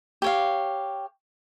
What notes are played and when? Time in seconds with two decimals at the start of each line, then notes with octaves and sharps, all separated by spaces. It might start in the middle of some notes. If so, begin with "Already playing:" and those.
0.22 G4 C#5 F5